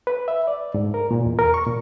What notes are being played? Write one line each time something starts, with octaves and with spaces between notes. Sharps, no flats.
B4
E5
D5
G#2
A#4
A#2
E2
A#4
C#6
A#2